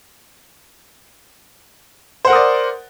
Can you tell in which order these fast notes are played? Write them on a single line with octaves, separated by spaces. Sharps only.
C5 F#5 A#4 D#6 D5